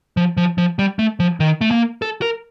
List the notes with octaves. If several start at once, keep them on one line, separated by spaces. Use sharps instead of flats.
F3
F3
F3
G3
A3
F3
D#3
A3
A#3
A4
A#4